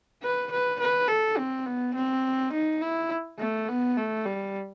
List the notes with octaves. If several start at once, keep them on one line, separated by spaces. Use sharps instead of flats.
B4
B4
B4
A4
C4
B3
C4
D#4
E4
A3
B3
A3
G3